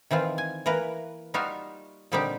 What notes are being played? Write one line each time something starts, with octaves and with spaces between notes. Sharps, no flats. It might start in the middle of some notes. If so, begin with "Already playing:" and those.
D#3 E3 C4 F4
G#5
E3 A#3 A#4 B4
G3 D#4 F4 F#4 E5 F5
A#2 D3 G3 C4 D#4 G4